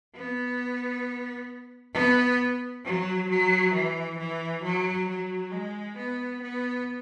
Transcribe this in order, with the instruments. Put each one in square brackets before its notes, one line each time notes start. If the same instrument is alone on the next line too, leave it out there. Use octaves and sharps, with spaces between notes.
[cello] B3
B3
F#3
F#3
E3
E3
F#3
F#3
G#3
B3
B3